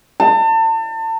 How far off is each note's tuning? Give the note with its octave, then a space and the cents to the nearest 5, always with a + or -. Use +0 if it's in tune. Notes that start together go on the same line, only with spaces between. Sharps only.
A5 +35